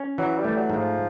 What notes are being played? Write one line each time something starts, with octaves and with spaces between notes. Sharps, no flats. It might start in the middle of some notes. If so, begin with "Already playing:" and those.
Already playing: C#4
E3 F#3
G3
A3
F#3
G#2
F3